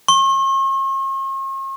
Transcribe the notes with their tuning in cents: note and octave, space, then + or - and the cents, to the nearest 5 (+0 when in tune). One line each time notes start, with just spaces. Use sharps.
C#6 -45